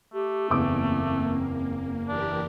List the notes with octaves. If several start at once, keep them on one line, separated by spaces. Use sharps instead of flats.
A3 G4
F#1 E2 A#3 C4 D6
E3 D4 G4 A#4